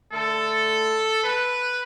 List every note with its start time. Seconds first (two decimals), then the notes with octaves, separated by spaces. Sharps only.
0.12 D3 A3 A4
1.24 B4